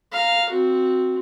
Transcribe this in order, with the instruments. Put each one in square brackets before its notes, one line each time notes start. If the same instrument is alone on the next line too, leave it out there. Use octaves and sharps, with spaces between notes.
[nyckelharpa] F5 A#5
C4 F#4